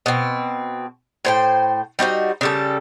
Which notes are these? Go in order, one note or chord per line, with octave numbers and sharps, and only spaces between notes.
B2 C4
A2 C5 G5
G3 D#4 F#4 C5
C#3 G3 A4